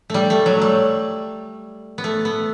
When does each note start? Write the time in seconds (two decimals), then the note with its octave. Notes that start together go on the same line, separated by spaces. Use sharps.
0.10 G3 A3
0.30 A3
0.46 F#3
0.62 G3
1.98 B3
2.04 A3
2.25 B3